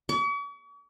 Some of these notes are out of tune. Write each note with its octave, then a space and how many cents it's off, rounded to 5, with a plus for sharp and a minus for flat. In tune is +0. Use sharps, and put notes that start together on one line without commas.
C#6 +45